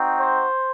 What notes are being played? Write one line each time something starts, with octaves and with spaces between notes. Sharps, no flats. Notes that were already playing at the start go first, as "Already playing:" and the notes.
Already playing: C4 D#4 F#4
C5